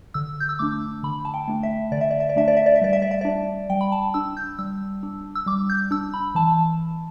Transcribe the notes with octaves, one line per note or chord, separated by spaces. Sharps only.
D3 E6
G6
E6
A3 D4 D6
D3 B5
A5
G5
A3 D4
E5
D3 D5
E5
D5
E5
D5
A3 D4 E5
D5
E5
D5
E5
G3 D5
E5
D5
E5
D4 D5
G3 G5
B5
A5
D4 E6
G6
G3 E6
D4
E6
G3 D6
G6
D4 E6
B5
E3 A5